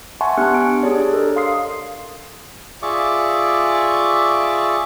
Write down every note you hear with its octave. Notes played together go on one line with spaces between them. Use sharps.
E5 F#5 G#5 A5 C6 C#6
B3 D4 G4 F6 F#6 C#7
D7
D4 G4 G#4 C#5 D5
A4 A#4 D#5
F5 C6 D#6 C7
F4 G#4 D5 E5 C#6 D6